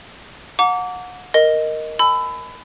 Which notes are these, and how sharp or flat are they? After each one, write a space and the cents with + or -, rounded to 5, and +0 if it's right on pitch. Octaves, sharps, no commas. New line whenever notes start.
F#5 -30 A#5 -40 D6 -30
A#4 +0 D#5 +0
G#5 +35 B5 +25 E6 +0